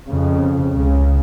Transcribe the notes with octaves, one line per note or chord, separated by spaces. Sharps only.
F2 C#3
C#2 C#3